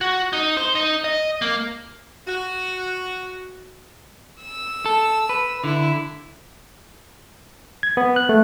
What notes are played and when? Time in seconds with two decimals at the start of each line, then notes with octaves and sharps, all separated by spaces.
0.01 F#4
0.33 D#4
0.57 C5
0.75 D#4
1.04 D#5
1.42 A#3
2.27 F#4
4.42 E6
4.86 A4
5.29 B4
5.64 D3 E4
7.83 G#6
7.97 B3
8.16 F#6
8.29 A3